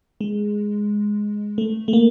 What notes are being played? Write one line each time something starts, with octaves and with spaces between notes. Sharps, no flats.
G#3
A3
A3
A#3